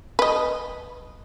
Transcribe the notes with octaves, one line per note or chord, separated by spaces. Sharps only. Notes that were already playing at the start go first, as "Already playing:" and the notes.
B4 D#5